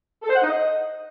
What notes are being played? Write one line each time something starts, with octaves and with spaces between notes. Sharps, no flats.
A4
C5
F#5
D#4
D#5